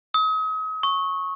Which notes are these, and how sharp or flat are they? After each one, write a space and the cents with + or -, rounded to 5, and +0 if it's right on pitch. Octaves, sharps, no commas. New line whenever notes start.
D#6 +40
C#6 -10